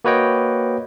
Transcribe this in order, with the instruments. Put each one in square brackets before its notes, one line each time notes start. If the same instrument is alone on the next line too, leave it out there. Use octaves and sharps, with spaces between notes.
[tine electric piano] A#3 F#4 B4 C#5 D#5 G5